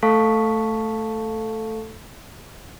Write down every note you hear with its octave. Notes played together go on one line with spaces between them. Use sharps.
A3 A4 F5 A5 C#6 B6